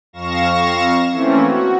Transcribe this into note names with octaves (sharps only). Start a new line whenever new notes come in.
F2 F5 C#6 A#6 E7
E3 A3 A#3 C4 C#4
F#4